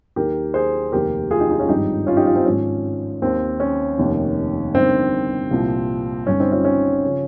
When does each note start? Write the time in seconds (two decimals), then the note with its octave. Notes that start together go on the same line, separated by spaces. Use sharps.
0.16 D#2 D#3 G4 A#4
0.54 G#4 C5
0.92 F1 D#2 D#3 G4 A#4
1.31 F4 G#4
1.40 D#4 G4
1.50 D#4 G4
1.59 C#4 F4
1.69 G#1 G2 F3 D#4 G4
2.07 C#4 F4
2.17 D#4 G4
2.27 C#4 F4
2.36 C4 D#4
2.45 G#1 G#2 F3 C#4
3.22 D#2 D#3 C4
3.60 C#4
3.98 F1 D#2 D#3
4.74 G1 G2 D#3 C4
5.51 C2 A#2 F3
6.27 G1 G2 D#3 C#4
6.40 C4 D#4
6.52 C#4 F4
6.65 C#4
7.03 C#3 F3